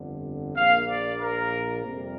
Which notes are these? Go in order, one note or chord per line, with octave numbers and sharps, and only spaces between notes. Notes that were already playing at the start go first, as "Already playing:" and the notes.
Already playing: G1 F2 D3
A#1 A#2 A#3 F5
D5
A#4
F2 C3 G3